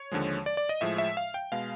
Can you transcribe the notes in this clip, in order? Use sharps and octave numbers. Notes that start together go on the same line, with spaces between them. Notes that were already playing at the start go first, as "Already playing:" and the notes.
Already playing: C#5
D#2 D3 F3 G#3
D5
D5
D#5
A2 F3 G#3 E5
E5
F5
G5
B2 G#3 F5